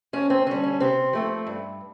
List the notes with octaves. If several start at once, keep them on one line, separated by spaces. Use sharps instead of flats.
F2 C#4
C4
D3 G3 C#4
C#4
C3 C4
F3 A3 C4
G2